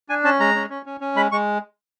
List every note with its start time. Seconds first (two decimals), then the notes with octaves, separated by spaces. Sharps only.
0.09 D4 G#5
0.24 C#4 A5
0.40 G#3 A#5
0.55 C#4
0.70 C#4
0.86 C#4
1.01 C#4
1.16 G#3 B5
1.32 G#3 C#6